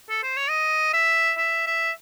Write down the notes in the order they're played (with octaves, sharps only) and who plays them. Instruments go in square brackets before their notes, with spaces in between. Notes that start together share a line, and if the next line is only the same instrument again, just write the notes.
[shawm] A4
C5
C#5
D#5
E5
E5
E5